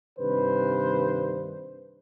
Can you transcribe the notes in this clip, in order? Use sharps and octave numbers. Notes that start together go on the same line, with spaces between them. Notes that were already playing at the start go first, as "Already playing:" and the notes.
G2 C3 D#3 B4 C5